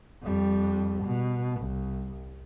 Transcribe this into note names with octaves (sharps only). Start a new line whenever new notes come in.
F2 G3
B2
C2